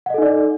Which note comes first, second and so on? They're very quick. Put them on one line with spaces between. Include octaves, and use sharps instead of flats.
F#5 D#5 A4 D#4 D5